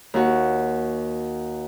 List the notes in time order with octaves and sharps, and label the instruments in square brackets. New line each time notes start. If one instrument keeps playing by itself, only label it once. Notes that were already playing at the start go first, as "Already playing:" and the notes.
[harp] D#2 F#4